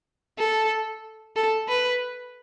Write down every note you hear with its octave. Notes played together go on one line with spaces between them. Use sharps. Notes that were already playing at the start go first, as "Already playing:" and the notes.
A4
A4
B4